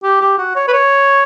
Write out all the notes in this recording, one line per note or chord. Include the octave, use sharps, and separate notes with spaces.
G4
G4
F#4
C#5
B4
C#5